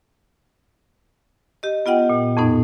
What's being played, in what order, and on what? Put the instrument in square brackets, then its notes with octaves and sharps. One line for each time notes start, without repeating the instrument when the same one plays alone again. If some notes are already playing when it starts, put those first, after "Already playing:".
[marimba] G4 D#5
B3 F4 D#5 F#5 G5
A#2
F2 A2 B3 D#4